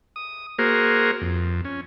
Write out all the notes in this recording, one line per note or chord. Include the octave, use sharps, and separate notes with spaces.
D#6
A#3 F#4 G#4 A#4 C5
F2
C#4